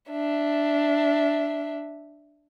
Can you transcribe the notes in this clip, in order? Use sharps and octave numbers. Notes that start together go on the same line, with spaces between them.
D4 E5